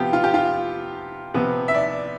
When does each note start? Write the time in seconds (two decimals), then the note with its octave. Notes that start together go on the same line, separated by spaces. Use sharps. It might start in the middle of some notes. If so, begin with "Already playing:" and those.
Already playing: C3 F3 B3 F4 G4
0.13 F4
0.24 G4
0.34 F4
1.34 C3 F3 B3
1.68 E5
1.74 D5